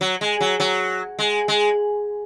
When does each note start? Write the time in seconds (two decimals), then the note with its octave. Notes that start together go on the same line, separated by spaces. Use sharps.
0.01 F#3
0.21 G#3
0.41 F#3
0.60 F#3
1.19 G#3
1.48 G#3